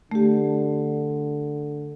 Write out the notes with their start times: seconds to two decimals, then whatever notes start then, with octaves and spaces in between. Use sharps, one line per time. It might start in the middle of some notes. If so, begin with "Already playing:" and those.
0.12 D3 A3 G4